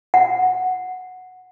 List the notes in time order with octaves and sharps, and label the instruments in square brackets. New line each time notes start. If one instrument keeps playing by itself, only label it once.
[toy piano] F#5